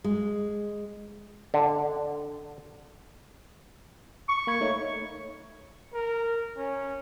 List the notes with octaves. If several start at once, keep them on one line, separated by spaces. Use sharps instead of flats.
G#3
D3
C#6
A#3 B5 G#6
A3 D#4 C#5
A#4
C#4